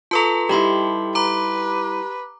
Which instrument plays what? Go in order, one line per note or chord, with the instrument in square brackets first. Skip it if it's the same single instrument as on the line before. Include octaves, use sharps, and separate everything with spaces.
[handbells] F4 A#5 [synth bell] A4 B4 A5
[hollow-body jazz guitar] G3 D#4 E4 [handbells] G4 B5 C6
[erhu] B4 [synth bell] A#5 D6